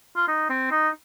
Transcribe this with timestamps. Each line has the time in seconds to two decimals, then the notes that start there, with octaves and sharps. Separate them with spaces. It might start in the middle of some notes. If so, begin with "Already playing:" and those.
0.16 F4
0.28 D#4
0.50 C4
0.71 D#4